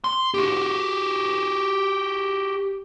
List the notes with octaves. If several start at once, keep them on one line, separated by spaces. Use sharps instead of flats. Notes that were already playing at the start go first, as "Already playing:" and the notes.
C6
F#4 G4